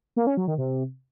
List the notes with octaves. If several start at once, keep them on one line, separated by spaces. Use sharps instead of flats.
A#3
C#4
F#3
D#3
C3